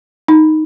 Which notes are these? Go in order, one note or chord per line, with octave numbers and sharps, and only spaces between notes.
D#4